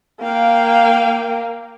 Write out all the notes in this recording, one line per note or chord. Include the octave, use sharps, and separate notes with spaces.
A#3 F5 G5